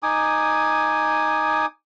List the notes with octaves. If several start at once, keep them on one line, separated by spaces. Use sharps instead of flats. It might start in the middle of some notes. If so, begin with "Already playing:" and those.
D#4 G#5 D6 D#6